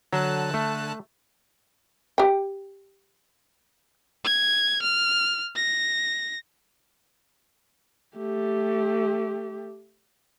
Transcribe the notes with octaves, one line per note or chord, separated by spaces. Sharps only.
D3 F#3 A5 F#6
A3
G4 G5
G#6
F6
A#6
A3 G4